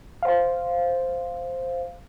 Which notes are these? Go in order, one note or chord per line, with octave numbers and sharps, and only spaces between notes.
C5 F5